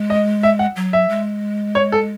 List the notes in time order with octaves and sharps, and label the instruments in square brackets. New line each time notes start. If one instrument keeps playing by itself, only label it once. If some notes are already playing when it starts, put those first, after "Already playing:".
Already playing: [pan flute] G#3
[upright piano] D#5
E5
F#5
[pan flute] F#3
[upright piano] E5
[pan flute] G#3
[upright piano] C#5
A4